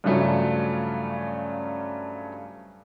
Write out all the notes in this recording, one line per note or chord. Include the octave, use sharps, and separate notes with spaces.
G2 C#3 F3 F#3 A3 C#4